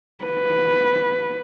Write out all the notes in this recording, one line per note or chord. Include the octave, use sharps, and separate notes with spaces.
B4